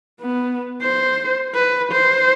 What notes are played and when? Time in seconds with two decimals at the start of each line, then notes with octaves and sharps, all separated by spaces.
0.21 B3
0.82 C5
1.55 B4
1.93 C5